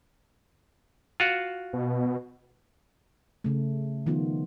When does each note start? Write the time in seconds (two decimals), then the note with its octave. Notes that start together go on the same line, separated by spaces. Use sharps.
1.20 F4 F#4
1.73 B2
3.44 C#3 A3
4.06 D#3 F3 B3 F4